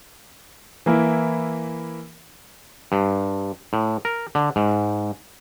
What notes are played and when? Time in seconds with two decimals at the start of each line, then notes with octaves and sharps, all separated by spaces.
0.86 E3 A#3 E4
2.92 G2
3.73 A2
4.05 A#4
4.35 D3
4.56 G#2